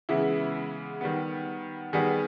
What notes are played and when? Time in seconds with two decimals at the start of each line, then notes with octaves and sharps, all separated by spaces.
0.09 C#3 E3 G#3 B3 E4
1.01 D#3 G3 B3
1.93 D#3 G3 B3 G#4